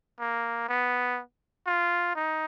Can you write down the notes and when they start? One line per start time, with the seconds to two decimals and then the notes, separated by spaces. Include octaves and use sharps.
0.20 A#3
0.69 B3
1.66 F4
2.16 D#4